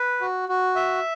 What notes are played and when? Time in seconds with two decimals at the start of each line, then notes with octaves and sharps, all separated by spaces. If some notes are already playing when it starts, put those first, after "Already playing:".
Already playing: B4
0.21 F#4
0.49 F#4
0.76 E5